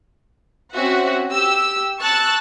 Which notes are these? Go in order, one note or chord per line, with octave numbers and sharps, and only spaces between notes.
C4 C#4 F#4 E5 F#5
G4 E6
A5 C#6 E6 F#6 A6